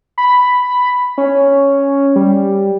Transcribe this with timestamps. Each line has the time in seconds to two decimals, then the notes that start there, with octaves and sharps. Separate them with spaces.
0.18 B5
1.18 C#4
2.16 G3